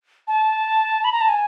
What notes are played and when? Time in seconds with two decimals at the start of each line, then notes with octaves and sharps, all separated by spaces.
0.27 A5
1.04 B5
1.13 A#5
1.21 A5
1.29 G#5